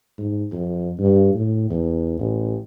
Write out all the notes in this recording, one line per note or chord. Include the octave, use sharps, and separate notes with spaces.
G#2
F2
G2
A2
E2
A1